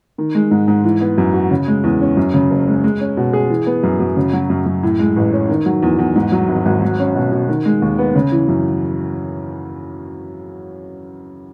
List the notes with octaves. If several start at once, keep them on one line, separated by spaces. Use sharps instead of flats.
D#3
G#3
G#2
G#2
E3
B3
F#2
F#4
C#3
G#3
E2
C#4
F#2
C#3
F#1
G#3
G#3
C#4
B2
G#4
E3
B3
F#2
F#2
C#3
F#3
F#2
F#2
A2
G#3
A1
C#4
D#3
F#3
E2
E2
G#2
F#3
G#1
G#1
F#3
C#4
B2
B2
D#3
G#3
D#2
B3
C#3
E3
F#2